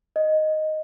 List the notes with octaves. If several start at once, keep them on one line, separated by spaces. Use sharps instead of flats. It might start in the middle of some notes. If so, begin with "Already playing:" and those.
D#5